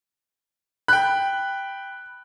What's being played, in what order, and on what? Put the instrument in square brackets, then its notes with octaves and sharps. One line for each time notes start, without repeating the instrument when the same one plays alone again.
[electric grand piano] G5 B5 [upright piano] F#6